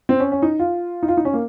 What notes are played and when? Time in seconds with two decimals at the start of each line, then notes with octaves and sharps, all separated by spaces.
0.09 C4
0.20 C#4
0.32 C#4
0.42 D#4
0.59 F4
1.03 D#4
1.08 F4
1.17 D#4
1.25 C#4
1.34 A#3